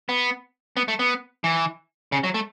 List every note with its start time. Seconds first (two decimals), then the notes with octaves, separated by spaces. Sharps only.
0.09 B3
0.77 B3
0.88 A3
0.99 B3
1.44 E3
2.12 C#3
2.24 F#3
2.34 A3